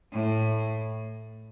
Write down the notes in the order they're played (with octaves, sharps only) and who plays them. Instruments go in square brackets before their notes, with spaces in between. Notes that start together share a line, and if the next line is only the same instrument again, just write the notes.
[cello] A2